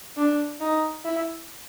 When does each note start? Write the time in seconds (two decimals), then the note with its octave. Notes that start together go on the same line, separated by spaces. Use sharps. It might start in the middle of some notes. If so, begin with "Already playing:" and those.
0.17 D4
0.61 D#4
1.05 E4